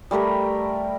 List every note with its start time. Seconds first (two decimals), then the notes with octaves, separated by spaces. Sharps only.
0.11 G3 A3 G4 A#4